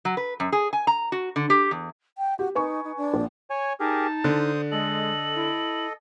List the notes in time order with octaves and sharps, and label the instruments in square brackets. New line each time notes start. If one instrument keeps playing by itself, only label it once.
[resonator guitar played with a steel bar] F#3
B4
F#2
G#4
G#5
A#5
F#4
D3
G4
E2
[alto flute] G5
[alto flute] F#4 [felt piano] G4
[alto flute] D#4 [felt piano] B4 G#5 C#6
[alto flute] D#4
D4
[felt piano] A#1
[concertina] C#5 G#5
[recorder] D#4 [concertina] G4 G#4 A#4 [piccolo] A5
[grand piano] D3 [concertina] C5 D#6
[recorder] G#3 [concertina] A4 D#5 [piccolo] F#7
[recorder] E4